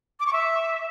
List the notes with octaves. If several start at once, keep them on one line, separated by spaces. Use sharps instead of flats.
D6
C#6
E5